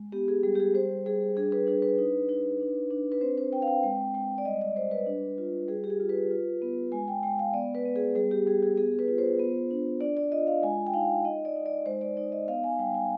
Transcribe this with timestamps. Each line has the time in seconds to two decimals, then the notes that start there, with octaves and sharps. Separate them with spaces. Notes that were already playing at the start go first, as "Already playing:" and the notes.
Already playing: G#3
0.12 B3 G4
0.28 G#4
0.43 G3 G#4
0.56 G4
0.60 G#4
0.74 G3 C5
1.06 G3 G#4
1.36 D4 G#4
1.52 B4
1.67 D4 G#4
1.82 B4
1.98 D#4
2.29 D#4
2.60 D4
2.90 D4
3.12 B4
3.21 C4 C5
3.38 C5
3.53 C4 G5
3.62 F5
3.67 G5
3.83 G#3 G5
4.14 G#3 G5
4.38 D5
4.45 G3 D#5
4.61 D5
4.76 G3 C5
4.91 B4
5.06 D4
5.38 F4
5.68 G3 G#4
5.84 G4
5.90 G#4
6.00 F4
6.09 B4
6.31 F4
6.62 B3
6.92 G#3 G#5
7.08 G5
7.23 G#3 G5
7.39 F5
7.53 B3 D5
7.75 B4
7.85 B3
7.96 G#4
8.15 G3 G#4
8.31 G4
8.46 G3 G#4
8.62 G#4
8.77 B3 G#4
8.99 B4
9.08 F4
9.18 C5
9.39 B3
9.71 D4
10.01 D4 D5
10.17 D5
10.32 F4 D#5
10.47 F5
10.62 G#3 G#5
10.87 G5
10.93 D#4 F5
11.25 D#4 D#5
11.45 D5
11.56 D#4
11.66 D5
11.86 G#3 C5
12.01 D5
12.17 D#4 D5
12.32 D#5
12.48 B3 F5
12.64 G#5
12.79 G3 G5
12.95 G#5